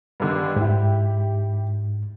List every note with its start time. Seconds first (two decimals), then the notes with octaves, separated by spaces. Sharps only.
0.20 G2 D3 D#3
0.56 G#2 E4 G4